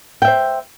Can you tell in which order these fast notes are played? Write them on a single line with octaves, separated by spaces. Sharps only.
G5 E5 C5